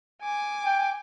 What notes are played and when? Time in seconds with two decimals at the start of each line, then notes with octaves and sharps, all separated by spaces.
0.22 G#5 D6
0.65 G5